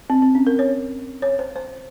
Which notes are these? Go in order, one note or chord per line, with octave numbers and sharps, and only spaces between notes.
C4
C4
C#4
A#4
C#5
C#5
C5
C5